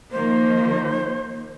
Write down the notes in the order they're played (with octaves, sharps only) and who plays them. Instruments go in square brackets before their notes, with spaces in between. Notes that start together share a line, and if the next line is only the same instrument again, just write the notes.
[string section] D#3 F3 A#3 [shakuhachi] C5